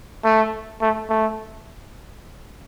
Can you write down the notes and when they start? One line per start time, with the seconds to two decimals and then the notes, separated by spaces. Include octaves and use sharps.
0.24 A3
0.81 A3
1.09 A3